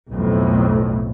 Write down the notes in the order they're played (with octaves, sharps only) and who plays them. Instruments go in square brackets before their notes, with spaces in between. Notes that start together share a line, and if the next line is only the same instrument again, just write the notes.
[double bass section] B1 F2 A2